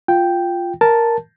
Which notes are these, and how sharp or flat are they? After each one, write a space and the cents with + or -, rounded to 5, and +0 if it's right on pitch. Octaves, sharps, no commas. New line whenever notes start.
F4 +0 G5 +0
A#4 +0 A5 +0